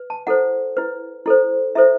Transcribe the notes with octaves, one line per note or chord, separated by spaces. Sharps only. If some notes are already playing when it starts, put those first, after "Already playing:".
Already playing: B4
A5
E4 A4 C5 F#5
E4 B4
E4 A4 C5
E4 A4 C5 E5